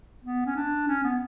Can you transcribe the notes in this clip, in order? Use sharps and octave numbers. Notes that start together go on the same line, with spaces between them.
B3
C#4
D4
C#4
B3